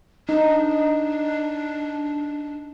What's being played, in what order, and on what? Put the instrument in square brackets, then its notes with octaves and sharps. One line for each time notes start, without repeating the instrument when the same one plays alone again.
[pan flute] D4 [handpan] D#4